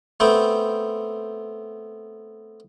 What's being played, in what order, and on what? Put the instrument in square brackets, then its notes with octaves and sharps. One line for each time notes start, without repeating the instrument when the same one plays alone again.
[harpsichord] A3 B3 C4 G5